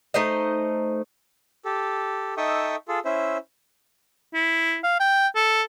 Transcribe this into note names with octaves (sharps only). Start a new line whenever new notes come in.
A3 D#4 C5 D#5
G4 A4
D#4 A4 E5 G5 C#6 D#6
F4 G#4 A4
C#4 E4 C5 E5
E4
F5
G5
A4